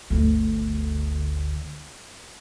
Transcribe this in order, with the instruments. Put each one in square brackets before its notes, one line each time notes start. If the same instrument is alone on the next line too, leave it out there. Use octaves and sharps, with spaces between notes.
[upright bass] G1 D2